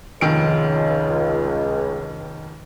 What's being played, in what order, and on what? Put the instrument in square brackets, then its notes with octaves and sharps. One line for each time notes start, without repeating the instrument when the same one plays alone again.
[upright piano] F1 D#3 D7 [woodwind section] C#2